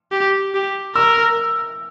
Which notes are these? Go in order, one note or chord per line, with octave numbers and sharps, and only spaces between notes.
G4
G4
A#4 E6